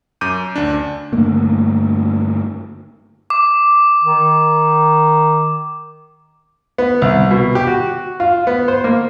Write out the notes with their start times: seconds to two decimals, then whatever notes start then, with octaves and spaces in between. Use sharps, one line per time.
0.21 F#2 D6 G6 D#7
0.56 D2 D4
1.13 G2 D3 A3 A#3
3.30 D6
4.03 D#3
6.78 B3
7.02 C2
7.31 B2
7.55 G4
7.67 F#4
8.20 F4
8.47 B3
8.68 C5
8.84 A#3